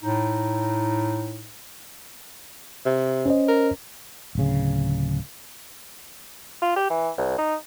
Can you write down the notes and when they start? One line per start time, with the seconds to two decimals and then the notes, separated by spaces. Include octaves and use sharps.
0.04 A2 D#4
2.86 C3
3.26 C#4 C5 D#5
3.48 A#4
4.35 D1 C#3
6.62 F4
6.76 G4
6.90 E3
7.18 C2
7.38 D#4